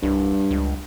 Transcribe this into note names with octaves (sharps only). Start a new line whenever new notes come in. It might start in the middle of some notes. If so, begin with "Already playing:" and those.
C2 G2
C#2